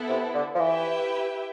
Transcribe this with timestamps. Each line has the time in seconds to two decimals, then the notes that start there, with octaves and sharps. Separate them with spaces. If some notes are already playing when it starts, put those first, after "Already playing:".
Already playing: B3 E4 A4
0.09 C3
0.35 D3
0.55 F3
0.59 E3 E4 G4 B4 E5 G5